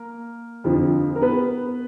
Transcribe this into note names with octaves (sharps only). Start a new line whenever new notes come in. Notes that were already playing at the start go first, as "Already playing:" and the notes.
Already playing: A#3 A#4
F2 D3 F3
A#4
B3 B4